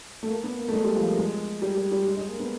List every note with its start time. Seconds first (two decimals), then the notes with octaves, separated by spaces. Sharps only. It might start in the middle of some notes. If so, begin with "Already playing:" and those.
0.23 A3
0.28 A#3
0.44 B3
0.59 A#3
0.68 A3
0.73 G#3
0.85 G3
0.96 F3
1.06 A#3
1.17 G#3
1.62 G3
1.77 G3
1.92 G3
2.06 G#3
2.17 G#3
2.28 A#3
2.40 B3